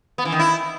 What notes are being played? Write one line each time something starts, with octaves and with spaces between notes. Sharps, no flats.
B3
E3
D#3
E4